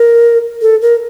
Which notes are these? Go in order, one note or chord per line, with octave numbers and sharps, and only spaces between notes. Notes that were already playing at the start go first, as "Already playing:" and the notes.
Already playing: A#4
A4
A#4